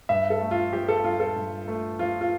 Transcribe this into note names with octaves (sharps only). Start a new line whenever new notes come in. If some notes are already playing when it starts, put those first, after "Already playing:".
G2 E5
A4
A3
F4
F3 G4
A4
G2 F4
A4
G2
A3
F3 F4
F4